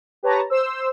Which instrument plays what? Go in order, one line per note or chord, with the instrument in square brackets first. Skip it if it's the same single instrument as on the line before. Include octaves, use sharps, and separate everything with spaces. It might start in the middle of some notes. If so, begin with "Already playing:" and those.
[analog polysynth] G4 B4 C#5 A5 A#5
C5 E6